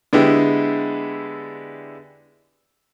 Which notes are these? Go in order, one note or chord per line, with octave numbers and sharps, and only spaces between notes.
D3 G#3 B3 E4 G4